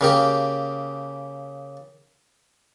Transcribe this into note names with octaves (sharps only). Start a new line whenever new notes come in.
C#3 A#3 G4